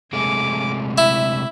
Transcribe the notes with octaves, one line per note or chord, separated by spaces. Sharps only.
C3 G#3 A3 G#5 D6
E4 E5